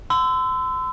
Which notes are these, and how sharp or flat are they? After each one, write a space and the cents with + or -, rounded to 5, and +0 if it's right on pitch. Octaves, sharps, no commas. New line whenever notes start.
C6 -40 E6 +0